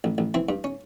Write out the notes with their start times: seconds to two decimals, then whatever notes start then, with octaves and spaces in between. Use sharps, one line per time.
0.04 A1
0.18 A1
0.34 E3 C4
0.49 G2
0.64 C#4